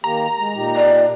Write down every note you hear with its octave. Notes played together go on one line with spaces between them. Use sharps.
D#3 A#3 G4 A#5
G#3
A#2 D#4 G4
D5